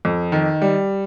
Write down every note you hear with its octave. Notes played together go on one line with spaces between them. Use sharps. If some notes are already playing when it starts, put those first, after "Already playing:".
F2
D#3
G3